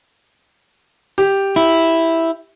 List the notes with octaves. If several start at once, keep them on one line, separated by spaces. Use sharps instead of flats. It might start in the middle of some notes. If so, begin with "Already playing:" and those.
G4
E4